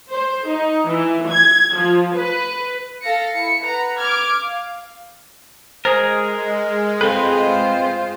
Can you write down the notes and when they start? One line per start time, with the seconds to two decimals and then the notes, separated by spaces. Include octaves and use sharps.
0.12 C5
0.48 D#4
0.88 E3
1.30 G#6
1.77 F3
2.17 B4
3.03 A4 F5 A#6 C#7
3.34 E4 C#7
3.65 B4 F#5 A#5
3.99 D6 F6 G#6
4.47 F5
5.85 G#3 G#4 A#4 C5
7.01 C4 F4 A4 B4 C5